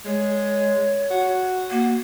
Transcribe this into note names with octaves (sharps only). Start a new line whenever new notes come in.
G#3 C#5
F#4
A#3 F#4